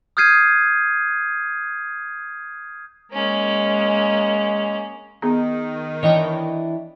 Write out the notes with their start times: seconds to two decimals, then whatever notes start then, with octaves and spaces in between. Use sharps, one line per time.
0.17 D#6 F6 G6 G#6 C7 D#7
3.12 G#3 A#3 C#4
5.22 D#3 B3 G#4 A#5
6.03 E3 D4 E4 C#5 D#5 G5